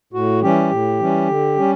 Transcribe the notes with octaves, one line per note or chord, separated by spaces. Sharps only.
A2 F#4
E3 G3 C#4 G4
A2
E3 G3 C#4
D3
G3 C#4